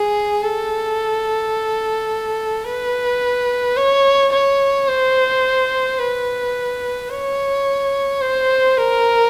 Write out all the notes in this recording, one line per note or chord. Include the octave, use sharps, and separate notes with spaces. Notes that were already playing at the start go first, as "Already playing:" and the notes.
Already playing: G#4
A4
B4
C#5
C#5
C5
B4
C#5
C5
A#4